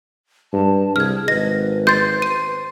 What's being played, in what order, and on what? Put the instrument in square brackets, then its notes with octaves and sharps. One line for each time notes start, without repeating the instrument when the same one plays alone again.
[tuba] G2 [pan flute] A5
[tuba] C2 [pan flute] G#4 [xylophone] F6 G#6
[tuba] G#1 [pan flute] B4 [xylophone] D#5 A#6
[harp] C5 [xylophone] G6 A6
[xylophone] D#7